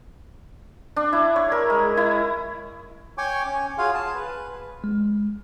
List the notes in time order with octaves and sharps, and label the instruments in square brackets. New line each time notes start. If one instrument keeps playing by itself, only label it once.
[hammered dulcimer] D4
E4
C#5
A#4
G#3
E4
[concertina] C#5 G5 G#5 C#6 D6
C#4
F4 F#4 G#4 C#5 F5
G#4 A5
B4
[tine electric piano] G#3